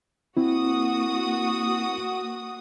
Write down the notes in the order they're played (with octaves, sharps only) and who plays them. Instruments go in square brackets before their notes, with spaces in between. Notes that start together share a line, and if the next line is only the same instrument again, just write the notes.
[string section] A#3 F#4 D#6 [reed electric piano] C4 E4